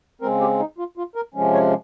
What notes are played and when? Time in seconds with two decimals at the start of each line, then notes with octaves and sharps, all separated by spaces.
0.21 C#3 G#3 C4 A#4
0.41 G4
0.59 D#4
0.78 F4
0.97 F4
1.15 A#4
1.34 C3 F3 G#3 C#4
1.53 C#5